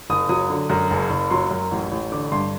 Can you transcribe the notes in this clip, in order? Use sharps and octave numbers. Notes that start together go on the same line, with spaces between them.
F#1 D#6
F#3 D#6
D3
F#2
F#1
F#1
F#3 C6
F#2
A1
A1
D3 D6
G2 C6